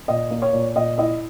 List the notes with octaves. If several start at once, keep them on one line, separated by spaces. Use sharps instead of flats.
A#2 D#5
A#3
C#5
A#2
A#2 D#5
E4 D#5